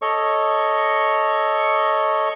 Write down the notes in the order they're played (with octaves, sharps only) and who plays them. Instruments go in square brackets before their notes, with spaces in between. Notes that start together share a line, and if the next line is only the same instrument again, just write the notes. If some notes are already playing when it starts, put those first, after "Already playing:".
[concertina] A4 C#5 D#5 C#6